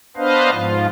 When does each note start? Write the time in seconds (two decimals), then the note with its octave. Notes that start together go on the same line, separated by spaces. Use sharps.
0.17 B3 D4 B4 C5 D#5 F5
0.51 G#2 F3 F4